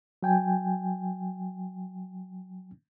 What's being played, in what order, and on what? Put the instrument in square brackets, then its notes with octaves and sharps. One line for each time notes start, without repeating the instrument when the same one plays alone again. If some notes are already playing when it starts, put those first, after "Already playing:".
[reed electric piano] F#3 G5 G#5